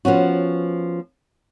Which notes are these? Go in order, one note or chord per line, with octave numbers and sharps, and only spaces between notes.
F3 B3 C#4 F#4